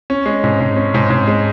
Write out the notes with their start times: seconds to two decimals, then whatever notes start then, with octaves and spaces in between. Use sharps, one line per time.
0.10 C#4
0.26 G#3
0.44 G#2
0.60 G#2
0.76 C#4
0.94 G#2
1.10 G#2
1.28 G#3